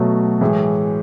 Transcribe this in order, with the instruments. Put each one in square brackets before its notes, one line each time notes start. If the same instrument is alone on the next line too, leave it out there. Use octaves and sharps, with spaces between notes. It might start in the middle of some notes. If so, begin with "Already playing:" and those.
Already playing: [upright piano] B2 F#3 A3
A2 E3 G#3